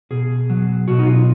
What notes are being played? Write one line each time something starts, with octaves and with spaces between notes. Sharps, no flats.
B2 G#4
F#3
B2 F#4
D#4
F4